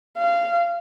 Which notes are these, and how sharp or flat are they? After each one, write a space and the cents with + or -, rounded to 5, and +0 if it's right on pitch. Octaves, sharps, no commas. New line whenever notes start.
F5 -20